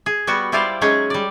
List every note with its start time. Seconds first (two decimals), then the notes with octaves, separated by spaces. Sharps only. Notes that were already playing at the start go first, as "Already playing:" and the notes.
0.06 G#4
0.27 G3 B3 F#4
0.52 G3 E4 F4 C5 D5 F5
0.81 F#3 G#3 C#4 D#4 G#4
1.10 G3 D5